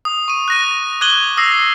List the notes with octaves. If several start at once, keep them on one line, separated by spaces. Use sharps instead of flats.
D#6
C#6 D#7
F#6 A#6 D#7
D6 F#6 G#6 D#7 F#7 G7
D#6 E6 A#6 C7